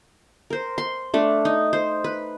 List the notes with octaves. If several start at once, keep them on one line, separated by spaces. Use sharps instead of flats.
A#4 C5
C6
A3 D4
D#4
C5
B4